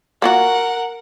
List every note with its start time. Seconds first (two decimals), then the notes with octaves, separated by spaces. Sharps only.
0.22 A#3 F4 F#4 A#4 F#5